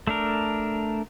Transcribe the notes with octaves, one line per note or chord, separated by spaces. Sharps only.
A3 D4 A#4